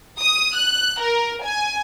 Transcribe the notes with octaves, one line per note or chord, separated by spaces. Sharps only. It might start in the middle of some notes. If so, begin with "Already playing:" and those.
D#6
F#6
A#4
G#5